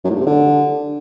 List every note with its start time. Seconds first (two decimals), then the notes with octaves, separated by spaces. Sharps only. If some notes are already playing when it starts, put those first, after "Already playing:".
0.05 F#2
0.10 A2
0.15 G2
0.21 C3
0.26 D3